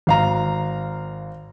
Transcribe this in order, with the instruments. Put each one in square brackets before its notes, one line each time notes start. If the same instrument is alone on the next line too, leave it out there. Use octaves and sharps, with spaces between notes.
[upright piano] G#1 F5 A#5